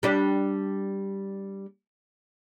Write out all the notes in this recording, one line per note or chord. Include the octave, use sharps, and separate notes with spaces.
G3 D4 G4